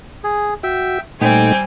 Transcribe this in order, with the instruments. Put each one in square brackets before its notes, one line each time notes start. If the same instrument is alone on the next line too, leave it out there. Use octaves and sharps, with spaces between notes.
[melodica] G#4
[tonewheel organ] F#4 [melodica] E5 G5
[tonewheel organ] A#2 A3 D#4 [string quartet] G3 C4 [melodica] G5 [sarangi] G#5